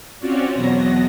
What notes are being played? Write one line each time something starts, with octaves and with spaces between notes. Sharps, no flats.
C4 C#4 F4 F#4 C#5 D5
E2 B2 F#3 B3 A#6